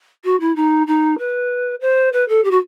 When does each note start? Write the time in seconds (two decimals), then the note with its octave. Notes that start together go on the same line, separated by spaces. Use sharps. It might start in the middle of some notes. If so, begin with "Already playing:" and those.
0.24 F#4
0.40 E4
0.56 D#4
0.87 D#4
1.19 B4
1.81 C5
2.13 B4
2.29 A4
2.44 G4
2.51 F#4